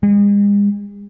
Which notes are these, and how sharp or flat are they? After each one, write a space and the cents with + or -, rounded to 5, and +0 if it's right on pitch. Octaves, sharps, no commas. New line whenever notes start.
G#3 -40